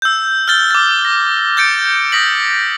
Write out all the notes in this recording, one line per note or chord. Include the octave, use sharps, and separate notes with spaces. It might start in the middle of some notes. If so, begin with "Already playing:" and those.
E6 G6
F6 G6 A6 G7
D6 A6
A#6
G6 A6 C#7 D7
D#6 A#6 B6 F#7